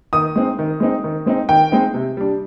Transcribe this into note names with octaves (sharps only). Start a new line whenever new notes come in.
D#3 D#6
G#3 C4 D#4
D#3
G#3 C4 D#4
D#3
G#3 C4 D#4
D#3 G5
G#3 C4 D#4
C3
G3 D4